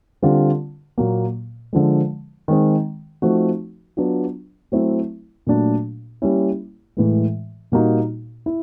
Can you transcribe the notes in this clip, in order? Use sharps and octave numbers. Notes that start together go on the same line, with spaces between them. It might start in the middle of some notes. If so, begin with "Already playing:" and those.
D3 G3 C4 F4
A#2 F#3 A#3
D3 F3 G#3
D#3 G#3 C4
F3 A3 C4 D#4 F#4
F#3 B3 D4 F4
F#3 A3 C4 E4
A#2 F#3 A3 D4 F#4
G3 A#3 C#4 E4
A2 E3 G#3
A#2 G3 A#3 D#4 F#4
E4